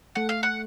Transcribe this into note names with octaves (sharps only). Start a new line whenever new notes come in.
A3 F#5
F5
F#5